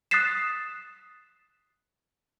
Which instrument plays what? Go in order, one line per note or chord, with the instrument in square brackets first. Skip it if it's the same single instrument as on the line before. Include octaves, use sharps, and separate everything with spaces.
[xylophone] D#6 F#6 A6 B6 C7 E7